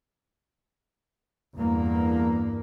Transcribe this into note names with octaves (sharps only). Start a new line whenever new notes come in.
E2 G2 A#3